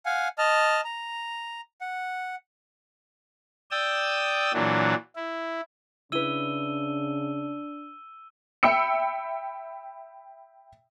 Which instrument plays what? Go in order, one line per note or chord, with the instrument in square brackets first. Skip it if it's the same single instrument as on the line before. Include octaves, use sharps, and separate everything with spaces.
[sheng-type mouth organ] F5 F#5 G#5
D#5 A5 F6
A#5
F#5
[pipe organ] D5 G5 D#6 E6
A#2 E3 F#3 D4
E4
[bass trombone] C#3 [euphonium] D4 [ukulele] E4 B4 [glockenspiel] E6 D#7 G7
[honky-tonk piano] E5 G5 B5 E6 C#7